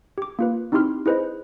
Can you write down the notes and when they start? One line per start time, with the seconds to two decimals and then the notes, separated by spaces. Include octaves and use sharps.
0.18 G4 D6
0.39 A#3 F4 B4
0.72 C4 D#4 E4 G4 C6 F6
1.06 E4 G#4 B4 C5 D#5